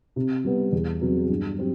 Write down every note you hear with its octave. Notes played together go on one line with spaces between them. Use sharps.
C3
G3 B3
E2
C3 F#3 B3
G2
F#3 C4 G4